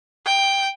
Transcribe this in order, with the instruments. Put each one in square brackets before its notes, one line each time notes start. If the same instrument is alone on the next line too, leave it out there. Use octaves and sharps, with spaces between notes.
[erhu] G5